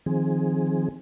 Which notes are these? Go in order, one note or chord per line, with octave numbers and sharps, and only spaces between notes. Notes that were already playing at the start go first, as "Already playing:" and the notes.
D#3 F3 C4 G#4